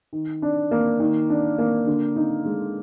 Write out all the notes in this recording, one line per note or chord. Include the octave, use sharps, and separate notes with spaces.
D#3
D4
A#3
D#3
D4
A#3
D3
D#4
G#3